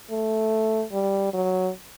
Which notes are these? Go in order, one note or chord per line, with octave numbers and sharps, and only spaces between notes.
A3
G3
F#3